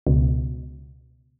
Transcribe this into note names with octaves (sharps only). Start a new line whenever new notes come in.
C#2 B2